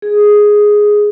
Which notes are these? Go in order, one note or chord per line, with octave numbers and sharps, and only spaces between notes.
G#4